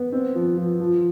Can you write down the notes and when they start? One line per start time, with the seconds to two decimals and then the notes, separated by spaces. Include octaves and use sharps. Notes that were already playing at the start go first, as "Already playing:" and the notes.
Already playing: B3
0.12 C4
0.35 F3
0.57 F3
0.80 F3